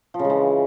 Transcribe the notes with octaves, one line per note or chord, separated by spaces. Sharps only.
F3
C#3
G#3
E3